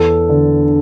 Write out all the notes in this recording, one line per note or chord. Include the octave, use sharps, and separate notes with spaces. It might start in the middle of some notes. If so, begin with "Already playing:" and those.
Already playing: E2 A4
D3